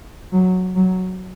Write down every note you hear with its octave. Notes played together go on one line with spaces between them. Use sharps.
F#3
F#3